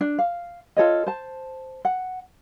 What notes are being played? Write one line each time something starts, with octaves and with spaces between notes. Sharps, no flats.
D4
F5
F4 A4 C#5 D#5
C5 A5
F#5